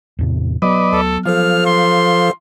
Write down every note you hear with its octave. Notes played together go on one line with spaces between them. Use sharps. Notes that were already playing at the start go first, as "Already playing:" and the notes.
E2 A2 C3
F#3 B3 B4 D5 D#5
D2 A4
F3 A4 C5 F5 F6
C6